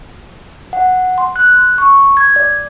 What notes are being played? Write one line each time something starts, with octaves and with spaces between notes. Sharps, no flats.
F#5
C6
F#6
C#6
G#6
D5